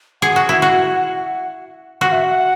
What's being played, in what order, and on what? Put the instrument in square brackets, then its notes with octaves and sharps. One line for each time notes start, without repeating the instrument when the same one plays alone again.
[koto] G#4 [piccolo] F#5
[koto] F#4
E4
F#4
[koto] F#4 [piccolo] F#5
[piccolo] E5
F#5